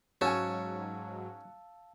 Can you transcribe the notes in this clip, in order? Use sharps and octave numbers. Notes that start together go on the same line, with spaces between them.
G#2 F#3 C#4 F#4 F5 G#5 A5 E6